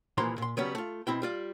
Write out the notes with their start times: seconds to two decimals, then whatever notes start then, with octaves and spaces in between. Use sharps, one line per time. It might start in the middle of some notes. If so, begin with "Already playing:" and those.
0.18 C2 A#2 E3 F3 A#5 C6
0.38 A#2 C6
0.57 C#3 F#3 G3 B3 C#4
0.75 A3 F4
1.07 B2 C4 E4 G5
1.22 G3 F4 D5